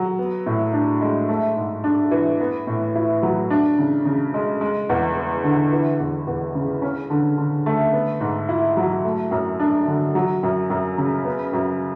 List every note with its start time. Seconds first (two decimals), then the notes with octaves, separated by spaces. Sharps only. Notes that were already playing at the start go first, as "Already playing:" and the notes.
Already playing: F#3
0.19 B3
0.46 A2
0.73 D4
1.01 G#3
1.29 A3
1.57 G#2
1.84 D4
2.11 E3
2.40 B3
2.67 A2
2.95 E4
3.23 F#3
3.50 D4
3.79 C#3
4.05 C#3
4.34 G#3
4.61 G#3
4.89 E2
5.16 B3
5.44 D3
5.72 E3
5.99 E2
6.27 E2
6.55 C#3
6.82 C#4
7.10 D3
7.37 D3
7.66 A3
7.93 B3
8.20 G#2
8.49 E4
8.77 F#3
9.05 A3
9.31 F#2
9.60 D4
9.87 D3
10.15 F#3
10.43 F#2
10.70 F#2
10.98 C#3
11.25 B3
11.53 F#2